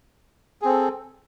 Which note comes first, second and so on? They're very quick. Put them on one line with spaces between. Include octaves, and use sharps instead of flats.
G#4 C4 A4